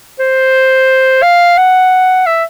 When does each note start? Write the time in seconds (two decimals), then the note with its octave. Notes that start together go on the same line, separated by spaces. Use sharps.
0.19 C5
1.22 F5
1.57 F#5
2.26 E5